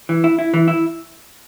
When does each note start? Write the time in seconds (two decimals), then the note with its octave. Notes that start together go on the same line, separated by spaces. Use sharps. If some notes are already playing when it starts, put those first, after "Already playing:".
0.09 E3
0.24 E4
0.39 E4
0.54 E3
0.68 E4